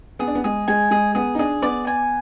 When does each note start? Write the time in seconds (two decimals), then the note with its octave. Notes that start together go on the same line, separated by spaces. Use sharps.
0.19 B3 G#4
0.28 D4
0.35 B3
0.44 G#3 G#4
0.68 G#3 G#5
0.91 G#3 G#4
1.15 B3 G#4
1.35 D#4
1.39 D4 G#4
1.62 B3 D5
1.87 G#5